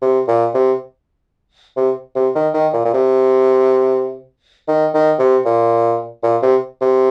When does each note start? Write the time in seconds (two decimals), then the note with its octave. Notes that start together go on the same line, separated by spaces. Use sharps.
0.02 C3
0.28 A#2
0.54 C3
1.77 C3
2.15 C3
2.35 D#3
2.54 D#3
2.73 A#2
2.85 A#2
2.93 C3
4.68 D#3
4.94 D#3
5.19 C3
5.45 A#2
6.23 A#2
6.42 C3
6.81 C3